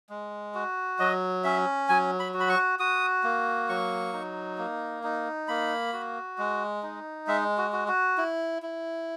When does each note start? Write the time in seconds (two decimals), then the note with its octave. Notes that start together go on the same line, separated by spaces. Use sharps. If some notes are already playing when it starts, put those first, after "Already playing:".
0.10 G#3
0.54 F#4
0.99 F#3 D#5
1.44 C#4 E5
1.89 F#3 G#5
2.19 B5
2.34 F#4
2.40 B5
2.49 C#6
2.79 F#4 D#6
3.23 A#3
3.69 F#3 C#6
4.13 D#4
4.58 A#3
5.03 D#4
5.48 A#3 B5
5.93 F#4
6.38 G#3
6.83 D#4
7.27 G#3 E5
7.58 F#4
7.73 F#4
7.88 F#4
8.18 E4
8.62 E4